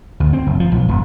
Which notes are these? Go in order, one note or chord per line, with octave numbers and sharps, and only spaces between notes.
D2
C4
F#1
F3
B1
E1